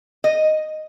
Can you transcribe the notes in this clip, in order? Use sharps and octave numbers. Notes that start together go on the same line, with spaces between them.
D#5